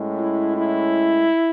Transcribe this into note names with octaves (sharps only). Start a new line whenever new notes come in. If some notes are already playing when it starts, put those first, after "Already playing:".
Already playing: A2 G#3 C#4
E4
E4